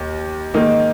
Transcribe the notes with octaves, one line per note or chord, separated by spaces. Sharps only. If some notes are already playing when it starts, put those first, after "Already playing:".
Already playing: D#2
G#2 D#3 A#3 D#4